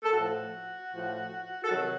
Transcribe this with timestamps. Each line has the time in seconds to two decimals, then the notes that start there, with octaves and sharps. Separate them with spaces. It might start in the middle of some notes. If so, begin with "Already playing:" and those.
0.03 A4
0.13 A2 F3 F#4
0.92 A2 F3
1.64 A4
1.69 C3 D#3 F#3 F#4